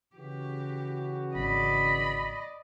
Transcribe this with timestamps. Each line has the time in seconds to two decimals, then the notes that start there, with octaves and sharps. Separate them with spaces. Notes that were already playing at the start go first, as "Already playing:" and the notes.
0.16 C#3 E3 F#4 G4
1.35 G#1 D5 D#5 B5